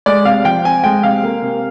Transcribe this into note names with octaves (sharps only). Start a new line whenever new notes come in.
G#3 D5
C3 F5
F3 G5
C4 G#5
G#3 G5
C3 F5
A#3
C3